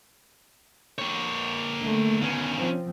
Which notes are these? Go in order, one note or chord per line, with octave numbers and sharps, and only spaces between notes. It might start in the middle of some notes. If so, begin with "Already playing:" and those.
A#3 C#5
D3 A3
D#3 B3 C#4
F3 C4